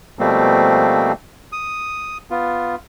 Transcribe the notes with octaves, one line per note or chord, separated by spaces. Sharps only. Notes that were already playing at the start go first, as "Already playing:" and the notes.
B2 F3 G3 A3 A#3 C4
D#6
B3 F4